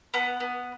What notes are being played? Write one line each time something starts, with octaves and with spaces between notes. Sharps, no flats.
B3 F#5
B3